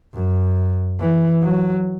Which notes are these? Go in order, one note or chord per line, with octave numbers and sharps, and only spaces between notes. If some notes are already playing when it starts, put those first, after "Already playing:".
F#2
E3
F#3